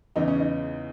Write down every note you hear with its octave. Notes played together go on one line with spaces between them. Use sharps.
E2 C#3 E3 D#4
C#4
D#4